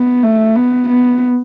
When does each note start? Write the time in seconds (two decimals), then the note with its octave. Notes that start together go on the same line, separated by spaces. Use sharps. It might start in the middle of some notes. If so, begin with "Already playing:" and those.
Already playing: B3
0.23 A3
0.56 B3
0.89 B3